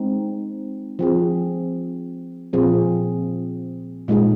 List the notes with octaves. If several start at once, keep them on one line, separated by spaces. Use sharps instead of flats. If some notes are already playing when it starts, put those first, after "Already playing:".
Already playing: G#3 C4 D#4
F3 C4 G#4
A#2 F3 C4 G#4
A#2 G#3 D#4 G#4